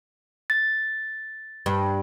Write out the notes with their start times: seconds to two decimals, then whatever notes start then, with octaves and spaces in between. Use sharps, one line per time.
0.50 A6
1.66 G2